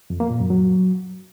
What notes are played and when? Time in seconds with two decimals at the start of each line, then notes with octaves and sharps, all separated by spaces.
0.10 F2
0.20 A#3
0.30 A#2
0.40 F#2
0.50 F#3